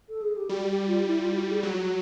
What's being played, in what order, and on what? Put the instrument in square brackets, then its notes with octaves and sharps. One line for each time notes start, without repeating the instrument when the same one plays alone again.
[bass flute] A4
G#4
G4
[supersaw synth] G3 [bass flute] F#4
[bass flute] G4
F4
E4
F4
F#4
G#4
[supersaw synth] F#3 [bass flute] F#4